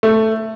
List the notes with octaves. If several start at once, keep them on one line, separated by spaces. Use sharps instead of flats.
A3